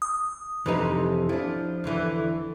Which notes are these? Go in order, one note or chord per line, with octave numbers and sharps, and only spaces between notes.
D#6
F2 C3 E3 D#4 B4
F3 D4 E4
E2 D3 E3